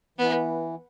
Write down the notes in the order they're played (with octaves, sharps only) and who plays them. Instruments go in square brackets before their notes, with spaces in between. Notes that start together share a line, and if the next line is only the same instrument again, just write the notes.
[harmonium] E3 [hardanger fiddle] B3